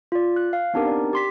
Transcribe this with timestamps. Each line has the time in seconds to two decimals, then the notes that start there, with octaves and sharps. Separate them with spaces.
0.12 F4 D5
0.36 F#6
0.53 F5
0.74 B3 C4 D4 D#4 G4 A#4
0.87 D5
1.13 G4 C6 B6